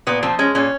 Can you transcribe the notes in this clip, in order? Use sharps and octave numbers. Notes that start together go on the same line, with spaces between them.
A#2 B3
F3 C4
G#3 C#4
A#2 C#4